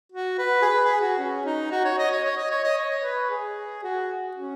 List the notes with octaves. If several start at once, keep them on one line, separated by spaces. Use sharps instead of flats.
F#4
B4
G#4
B4
G#4
F#4
C#4
D#4
F#4
C#5
D#5
C#5
C#5
D#5
C#5
D#5
C#5
B4
G#4
F#4
C#4